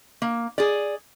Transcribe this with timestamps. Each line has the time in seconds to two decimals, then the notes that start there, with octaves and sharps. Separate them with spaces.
0.22 A#3
0.58 G#4 D5